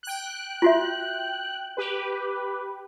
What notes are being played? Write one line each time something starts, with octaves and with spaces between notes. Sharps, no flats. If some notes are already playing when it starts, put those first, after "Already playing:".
G5 F#6
F4 F#4 E5
G4 B4